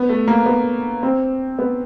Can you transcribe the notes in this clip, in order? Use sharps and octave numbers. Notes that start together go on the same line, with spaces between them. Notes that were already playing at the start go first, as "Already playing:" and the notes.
Already playing: B3
A3
A#3
B3
C4
B3